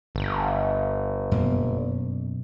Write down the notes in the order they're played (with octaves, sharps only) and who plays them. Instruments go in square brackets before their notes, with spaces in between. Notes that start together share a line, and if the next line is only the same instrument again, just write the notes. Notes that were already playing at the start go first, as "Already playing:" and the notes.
[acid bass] G1
[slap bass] F#2 B2 A#3